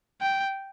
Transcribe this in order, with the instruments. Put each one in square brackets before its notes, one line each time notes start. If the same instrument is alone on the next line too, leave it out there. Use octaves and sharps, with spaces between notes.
[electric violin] G5